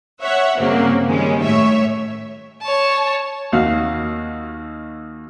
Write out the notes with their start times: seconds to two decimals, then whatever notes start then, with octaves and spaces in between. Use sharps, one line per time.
0.21 C#5 E5 F#5
0.59 G2 C#3 F#3 A#3 C4
1.07 D#3 G3 G#3 C#4
1.42 A2 C#5 E5
2.62 C#5 A5
3.52 D#2 F#4 F5